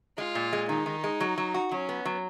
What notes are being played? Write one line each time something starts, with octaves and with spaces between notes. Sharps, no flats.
G#3 F4
A#2
G#3
D#3 D#4
D#3
G#3
F#3
F#3
F#4
F#3 C#4
B3
F#3